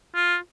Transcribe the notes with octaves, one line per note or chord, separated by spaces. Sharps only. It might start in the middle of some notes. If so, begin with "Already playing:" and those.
F4